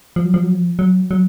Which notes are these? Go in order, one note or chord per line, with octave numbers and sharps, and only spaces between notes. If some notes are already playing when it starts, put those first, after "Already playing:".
F3
F#3
F3
F#3
F3
F#3
F#3